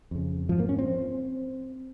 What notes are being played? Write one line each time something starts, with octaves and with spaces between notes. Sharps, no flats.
F2 C#3
G#2 F3
A#3
C#4
C4